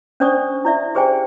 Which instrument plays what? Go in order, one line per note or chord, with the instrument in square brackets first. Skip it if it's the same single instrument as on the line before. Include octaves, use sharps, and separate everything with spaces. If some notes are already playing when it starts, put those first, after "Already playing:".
[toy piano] C#4 D4 C5 D5 C#6 D#6
E4 D5 E5
G4 G#4 C5 D5 G5 G#5